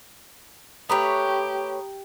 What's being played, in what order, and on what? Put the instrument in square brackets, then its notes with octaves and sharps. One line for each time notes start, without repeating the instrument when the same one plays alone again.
[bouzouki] A3 B4 C#5 [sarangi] G4 [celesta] A#5 B5 D#6